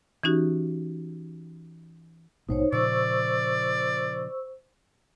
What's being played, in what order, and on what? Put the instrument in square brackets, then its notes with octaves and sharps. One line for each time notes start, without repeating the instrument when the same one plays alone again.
[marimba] E3 C#4 D#4 F#4 G4
[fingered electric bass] A#1 G#2 B2 [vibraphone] D#4 C5 C#5
[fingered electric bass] A#2 C#3 F3 [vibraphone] C5 C#6 E6 [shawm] D5